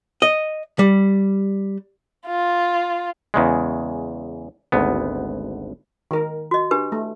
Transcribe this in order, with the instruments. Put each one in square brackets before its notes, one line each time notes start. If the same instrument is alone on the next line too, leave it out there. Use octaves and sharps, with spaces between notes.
[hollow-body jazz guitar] D#5
G3
[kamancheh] F4
[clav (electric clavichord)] E2 C#3 G#3
G#1 D2 B3
[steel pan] D#3 A#4
[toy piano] F#4 D#5
D4 G4 B4
[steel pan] A3